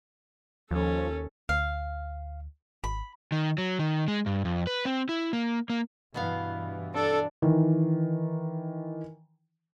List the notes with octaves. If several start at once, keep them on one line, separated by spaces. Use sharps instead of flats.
D#2 F3 C#4 A4
D2 F5
G#1 B5
D#3
F#3
D#3
G#3
G2
F2
B4
C4
E4
A#3
A#3
G2 B2 E3 B3 F5
D4 A4
D#3 E3